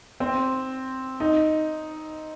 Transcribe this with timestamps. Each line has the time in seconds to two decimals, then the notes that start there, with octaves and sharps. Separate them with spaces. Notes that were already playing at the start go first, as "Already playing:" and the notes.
0.20 C4
1.20 D#4